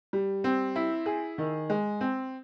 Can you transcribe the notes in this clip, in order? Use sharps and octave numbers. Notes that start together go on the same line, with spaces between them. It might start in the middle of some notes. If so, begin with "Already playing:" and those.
G3
C4
E4
G#4
D#3
G#3
C4